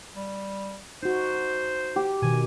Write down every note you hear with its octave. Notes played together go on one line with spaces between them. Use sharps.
G3
D#4 F#4 C5
G4
B2 D#3 G#5